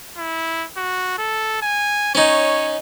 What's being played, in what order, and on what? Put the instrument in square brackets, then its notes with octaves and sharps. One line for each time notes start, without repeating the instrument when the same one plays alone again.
[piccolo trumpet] E4
F#4
A4
G#5
[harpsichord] C#4 D#4 [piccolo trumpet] C#5